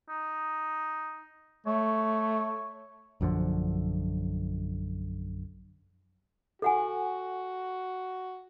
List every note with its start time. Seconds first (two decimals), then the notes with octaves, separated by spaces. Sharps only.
0.09 D#4
1.67 A3 C#5
3.21 A#1 F#2 D3 F3
6.62 F#4 A4 F#5 G#5